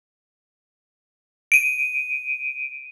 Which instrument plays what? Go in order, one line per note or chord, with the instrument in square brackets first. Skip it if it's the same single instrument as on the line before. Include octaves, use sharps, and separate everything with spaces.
[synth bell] D7 D#7